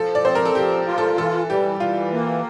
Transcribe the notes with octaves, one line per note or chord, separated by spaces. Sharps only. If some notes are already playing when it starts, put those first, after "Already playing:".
Already playing: F3 A4
D5
C4 C5
A#4
A4
F3 G4
F4
A4
E3 A4
G3 G4
E3 F4
A#3